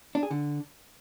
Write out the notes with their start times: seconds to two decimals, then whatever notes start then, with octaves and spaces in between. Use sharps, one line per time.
0.15 D4
0.23 G#4
0.31 D3